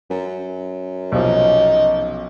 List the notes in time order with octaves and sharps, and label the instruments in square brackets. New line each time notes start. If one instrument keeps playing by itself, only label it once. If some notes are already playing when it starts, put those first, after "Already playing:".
[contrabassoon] F#2
[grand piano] B1 C3 F3 [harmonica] D#4